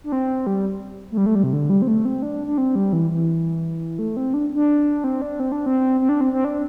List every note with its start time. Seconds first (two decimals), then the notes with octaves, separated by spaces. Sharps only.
0.04 D4
0.12 C4
0.47 G3
1.11 A3
1.17 G3
1.26 A3
1.35 G3
1.44 C3
1.53 D3
1.70 G3
1.82 C4
1.88 A3
2.05 C4
2.22 D4
2.47 D4
2.58 C4
2.75 G3
2.93 E3
3.11 E3
3.99 A3
4.17 C4
4.34 D4
4.54 D4
5.04 C4
5.22 D4
5.40 C4
5.52 D4
5.66 C4
6.00 C4
6.09 D4
6.21 C4
6.33 C4
6.44 D4